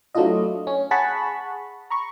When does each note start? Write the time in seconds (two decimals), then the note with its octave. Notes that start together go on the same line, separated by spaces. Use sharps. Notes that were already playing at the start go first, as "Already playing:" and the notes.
0.15 F#3 A3 D4 E4 F4 D#5
0.67 C#4
0.91 G#4 F#5 A5 B5 C#6
1.90 A#5 B5 C#6